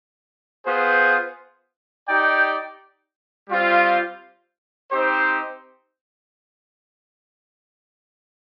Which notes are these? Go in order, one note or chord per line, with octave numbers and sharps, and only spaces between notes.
B3 F4 G#4 C5
D#4 G4 D5 G5
G3 C4 F4 C5
C4 D#4 G4 C5